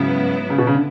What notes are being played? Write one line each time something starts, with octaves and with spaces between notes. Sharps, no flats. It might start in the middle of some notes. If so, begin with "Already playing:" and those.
Already playing: G#2 C#3 F#3 B3 E4
C#3
B2
C#3
D3